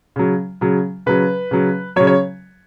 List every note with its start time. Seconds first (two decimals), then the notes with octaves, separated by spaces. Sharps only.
0.16 C#3 F#3
0.61 C#3 F#3
1.06 C#3 F#3 B4
1.51 C#3 F#3
1.96 F#3 C#5
2.00 C#3
2.07 C#5